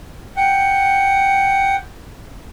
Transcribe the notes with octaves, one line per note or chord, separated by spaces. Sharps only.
F#5 G5